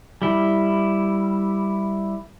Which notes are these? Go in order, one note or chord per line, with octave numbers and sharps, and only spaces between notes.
G3 E4